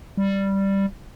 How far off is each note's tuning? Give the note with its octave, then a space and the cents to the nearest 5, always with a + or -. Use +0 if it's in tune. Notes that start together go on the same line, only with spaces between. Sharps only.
G3 +0